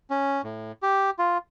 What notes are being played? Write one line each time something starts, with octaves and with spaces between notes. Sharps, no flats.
C#4
A2
G4
F4